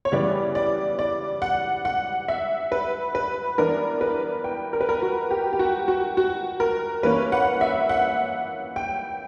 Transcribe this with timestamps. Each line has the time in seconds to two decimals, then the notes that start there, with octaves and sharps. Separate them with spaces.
0.05 C#5
0.12 C#3 E3 G3 B3 D5
0.55 D5
0.99 D5
1.42 F#5
1.85 F#5
2.28 E5
2.72 B4
3.15 B4
3.58 E3 B3 D4 A#4
4.01 B4
4.44 G5
4.73 A#4
4.81 B4
4.89 A#4
5.02 F#4
5.31 G4
5.53 G4
5.59 F#4
5.88 F#4
6.17 F#4
6.60 A#4
7.03 E3 A#3 C#4 B4
7.32 F#5
7.61 E5
7.89 F#5
8.76 G5